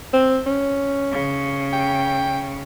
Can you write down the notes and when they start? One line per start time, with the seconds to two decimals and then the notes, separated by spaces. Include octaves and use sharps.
0.13 C4
0.46 C#4
1.12 C#3
1.73 G5